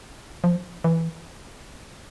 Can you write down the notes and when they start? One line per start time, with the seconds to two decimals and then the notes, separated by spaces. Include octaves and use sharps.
0.44 F3
0.84 E3